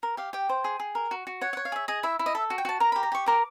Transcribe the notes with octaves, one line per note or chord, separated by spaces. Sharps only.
A#4
G4 F5
G4 G5
C5
G#4
G#4
A#4
F#4
F#4
C#5 F#5
F#5
C#5
F5
G#4 E5
G#4 D#5
E4 E5
E4
D#5
A4 E5
F#4
G5
F#4 A5
A#4 A#5
G4 B5
A#5
G4 C#6
A#4 D6